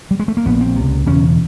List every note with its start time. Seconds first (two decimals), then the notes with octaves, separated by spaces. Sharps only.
0.11 G3
0.20 G#3
0.28 A3
0.37 A#3
0.45 A#1 A#2 B3
0.61 C4
0.76 C#2 C3
1.06 E1 E2 C#3 C#4